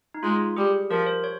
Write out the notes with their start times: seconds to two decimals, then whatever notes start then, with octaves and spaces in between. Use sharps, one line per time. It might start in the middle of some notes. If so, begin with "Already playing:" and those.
0.14 D#4
0.23 G#3 F4
0.57 G3 G#4
0.91 F3 A#4
1.06 C5
1.24 C#5